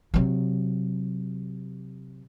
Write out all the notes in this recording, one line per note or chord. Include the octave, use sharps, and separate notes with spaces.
C3 F#3